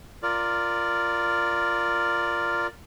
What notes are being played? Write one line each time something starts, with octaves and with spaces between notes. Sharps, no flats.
F4 A#4 D5